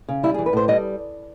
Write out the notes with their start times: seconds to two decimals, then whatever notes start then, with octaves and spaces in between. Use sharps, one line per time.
0.08 C#3
0.23 G3 E4
0.34 G#4
0.38 E3
0.46 B4
0.53 A2 C5
0.68 G3 D#5